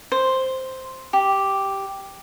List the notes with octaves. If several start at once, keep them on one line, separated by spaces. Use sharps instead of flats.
C5
G4